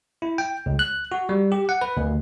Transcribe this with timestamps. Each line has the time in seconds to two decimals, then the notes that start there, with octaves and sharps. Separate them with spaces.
0.22 E4
0.38 G5
0.66 C#2
0.79 F#6
1.12 F#4
1.29 G3
1.52 G4
1.69 F#5
1.81 B4
1.97 D2